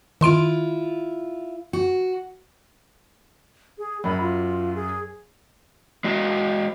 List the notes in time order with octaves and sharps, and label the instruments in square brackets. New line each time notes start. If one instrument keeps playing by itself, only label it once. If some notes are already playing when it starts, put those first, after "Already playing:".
[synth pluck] D#3 C6 D7 [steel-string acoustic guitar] E4 F4
[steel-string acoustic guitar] F#4
[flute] G#4
[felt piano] F#2 F#3 [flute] B5
[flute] F4
G#4
[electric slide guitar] G#3 F#4